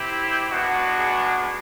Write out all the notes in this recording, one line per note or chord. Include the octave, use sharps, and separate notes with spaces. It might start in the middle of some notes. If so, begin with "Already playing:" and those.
Already playing: C4 E4 G4
G#3 B3 D4 F#4
G#4